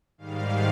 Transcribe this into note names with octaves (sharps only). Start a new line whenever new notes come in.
G#2 D#3 G3 F5